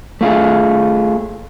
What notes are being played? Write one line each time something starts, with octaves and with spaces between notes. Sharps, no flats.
A3 F4 G#4